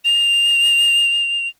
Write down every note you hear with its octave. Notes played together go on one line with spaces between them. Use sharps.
F7